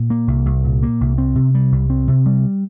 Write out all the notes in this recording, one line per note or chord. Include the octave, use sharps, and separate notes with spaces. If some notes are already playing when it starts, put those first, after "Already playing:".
Already playing: A#2
A#3
C2
C2
A#2
A#3
C2
C4
C3
G3
C2
C4
C3
G3